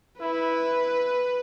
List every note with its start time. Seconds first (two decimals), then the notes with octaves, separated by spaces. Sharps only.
0.20 E4 B4